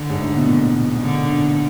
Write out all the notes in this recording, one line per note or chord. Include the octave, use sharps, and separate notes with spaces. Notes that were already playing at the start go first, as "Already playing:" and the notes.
Already playing: D3
G#2
A2
B2
A#2
D3